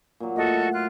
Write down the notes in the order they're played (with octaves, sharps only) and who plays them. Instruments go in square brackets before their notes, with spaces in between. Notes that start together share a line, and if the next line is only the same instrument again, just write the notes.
[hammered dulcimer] A#2 F#3
[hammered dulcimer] A2 [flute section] F#4 A4 D#5
[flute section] F4 F#6